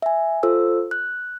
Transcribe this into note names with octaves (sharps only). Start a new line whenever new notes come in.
E5 G#5
F4 A4 C5 E6
F#6